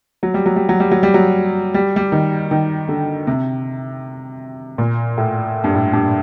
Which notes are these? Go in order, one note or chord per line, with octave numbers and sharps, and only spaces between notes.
F#3
G3
F#3
G3
F#3
G3
F#3
G3
F#3
G3
G3
D#3
D#3
D3
C3
A#2
A2
G2
A2
G2